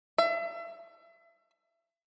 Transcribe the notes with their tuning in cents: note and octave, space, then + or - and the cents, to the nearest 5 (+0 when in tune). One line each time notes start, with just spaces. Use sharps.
E5 +35